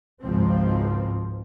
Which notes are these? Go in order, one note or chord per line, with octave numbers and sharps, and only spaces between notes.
G#1 C#2 G#2 F3 C4